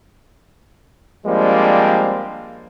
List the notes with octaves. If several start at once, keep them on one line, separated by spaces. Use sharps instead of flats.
F3 G3 G#3 A#3 C4 D4